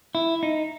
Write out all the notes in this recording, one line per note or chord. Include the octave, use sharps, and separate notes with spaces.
E4
D#4